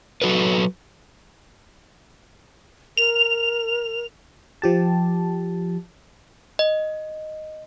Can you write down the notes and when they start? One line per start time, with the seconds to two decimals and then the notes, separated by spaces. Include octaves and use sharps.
0.22 F#3 F#4 A4 B4
2.97 A#4 F7
4.62 F3 G4 A5
6.59 D#5